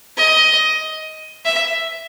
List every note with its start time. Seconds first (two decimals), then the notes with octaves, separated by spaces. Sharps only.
0.17 D#5
1.45 E5